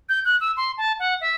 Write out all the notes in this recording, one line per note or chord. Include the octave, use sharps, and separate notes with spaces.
G6
F#6
E6
C6
A5
F#5
E5